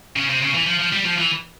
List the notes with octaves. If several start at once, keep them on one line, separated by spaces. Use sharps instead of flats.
C#3
C3
C#3
E3
F3
F3
G3
F3
E3